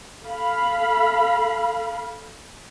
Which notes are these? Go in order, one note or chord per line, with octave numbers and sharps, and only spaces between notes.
A4 F5 B5